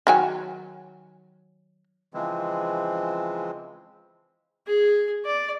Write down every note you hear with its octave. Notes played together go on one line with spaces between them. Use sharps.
D#3 F#3 G#5
C#3 E3 F3 G#3 C4
G#4
D5